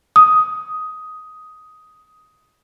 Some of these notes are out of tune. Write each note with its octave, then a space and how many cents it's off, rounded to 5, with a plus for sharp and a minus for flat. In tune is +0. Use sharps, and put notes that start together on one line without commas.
D#6 +10